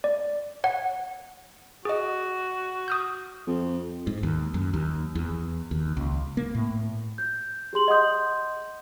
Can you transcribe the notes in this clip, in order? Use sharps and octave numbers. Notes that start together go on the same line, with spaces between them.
D5
C#5 F#5
F#4 G#4 D#5
D#6 F6 G6
F2
G#2
D#2
F#2
D#2
E2
D#2
C#2
A#3
A2
G6
G4 G#4 C6 F#7
D#5 F#5 C6 D#6 G6